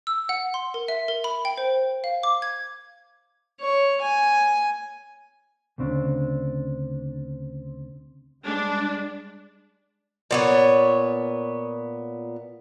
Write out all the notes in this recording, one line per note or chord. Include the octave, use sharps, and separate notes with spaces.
E6
F#5
C6
A#4
E5
A#4
B5
G5
C5
F5
D6
G#6
C#5
G#5
D2 C#3 C4 D4
G3 G#3 D4
A#2 B3 C#5